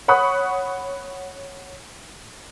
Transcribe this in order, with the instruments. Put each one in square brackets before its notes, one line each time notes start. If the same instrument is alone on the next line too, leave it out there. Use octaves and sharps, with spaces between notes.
[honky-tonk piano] C#5 F#5 B5 C#6 D#6 F#6